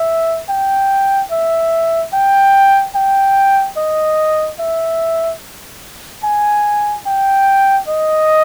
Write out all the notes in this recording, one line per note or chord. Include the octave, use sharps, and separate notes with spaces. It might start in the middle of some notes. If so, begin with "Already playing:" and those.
Already playing: E5
G5
E5
G5
G5
D#5
E5
G#5
G5
D#5